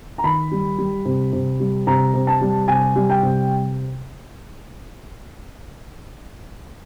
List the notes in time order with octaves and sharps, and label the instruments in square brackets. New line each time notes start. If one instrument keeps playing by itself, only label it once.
[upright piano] A#5
D#3 B5
G3
G3
C3
C3
G3
C3 A#5
C3
A5
G3
C3 G#5
G3
G5
C3